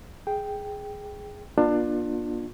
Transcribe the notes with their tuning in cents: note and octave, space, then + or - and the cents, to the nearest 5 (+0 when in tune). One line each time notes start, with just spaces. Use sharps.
G#4 +0 G5 +0
A#3 +45 D4 +25 F4 +20